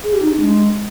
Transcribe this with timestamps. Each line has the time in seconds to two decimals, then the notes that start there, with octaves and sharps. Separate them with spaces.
0.03 G#4
0.13 G4
0.22 D#4
0.31 D4
0.40 G#3